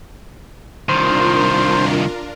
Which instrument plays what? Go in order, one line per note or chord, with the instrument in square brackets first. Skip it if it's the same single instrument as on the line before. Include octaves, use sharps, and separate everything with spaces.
[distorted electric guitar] C2 D#3 [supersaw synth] D4 F4 A#4 [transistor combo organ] C5